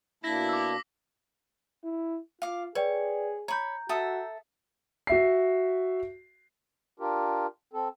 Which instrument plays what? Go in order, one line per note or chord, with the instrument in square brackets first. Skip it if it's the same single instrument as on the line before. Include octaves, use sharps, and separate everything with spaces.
[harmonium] B2 A#3 D4 [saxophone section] E4 [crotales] A#6 B6
[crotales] D6 E6
[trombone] E4
[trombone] F4 [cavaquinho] F5 D6
[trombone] G#4 [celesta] B4 D5 G5 [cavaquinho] C#5
[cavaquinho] C#5 B5 [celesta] A#5 G6
[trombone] F#4 [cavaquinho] A4 E5 D#6
[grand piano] F#4 E5 C7
[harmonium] D4 F4 G4 A#4
C4 A4